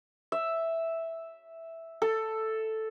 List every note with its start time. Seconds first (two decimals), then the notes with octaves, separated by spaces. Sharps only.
0.32 E5
2.02 A4